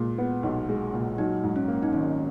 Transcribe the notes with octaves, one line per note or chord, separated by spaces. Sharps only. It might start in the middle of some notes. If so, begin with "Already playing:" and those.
Already playing: A#2 G#3
B3
B1
G#3
A#2
F#3 D#4
G#2
C#4
A#3
D#4
G#1 C#4